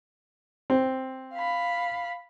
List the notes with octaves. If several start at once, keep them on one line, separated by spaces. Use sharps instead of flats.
C4
F5 B5